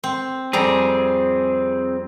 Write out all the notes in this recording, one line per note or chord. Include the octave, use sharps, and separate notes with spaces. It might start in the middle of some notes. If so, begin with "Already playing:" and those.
C4
F2 G3 C4 G#4 A#5